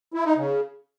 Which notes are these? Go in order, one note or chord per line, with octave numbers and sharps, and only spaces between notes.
E4
D#4
C#3